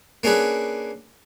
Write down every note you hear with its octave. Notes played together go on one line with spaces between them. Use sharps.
A#3 C#4 D4 G#4 B4